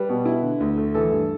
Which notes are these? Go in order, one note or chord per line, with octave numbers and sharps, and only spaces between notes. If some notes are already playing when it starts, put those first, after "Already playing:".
Already playing: G3 B4
B2
E4
D3
D2
A3
E3 A4
G2